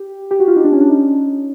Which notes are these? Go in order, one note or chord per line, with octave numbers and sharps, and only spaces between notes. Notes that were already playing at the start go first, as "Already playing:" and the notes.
Already playing: G4
G4
F#4
F4
D#4
D4
C#4
D4
D#4